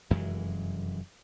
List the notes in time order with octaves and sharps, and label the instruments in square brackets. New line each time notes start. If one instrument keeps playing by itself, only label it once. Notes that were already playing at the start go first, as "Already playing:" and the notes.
[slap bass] F1 F#2 E3 G#3